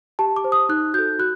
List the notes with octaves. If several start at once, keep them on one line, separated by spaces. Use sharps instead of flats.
G4 A5
D6
C5
D#6
D#4 F#6
F#4 A4 G6
F#4 F#6